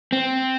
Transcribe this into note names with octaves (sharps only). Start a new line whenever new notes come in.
C4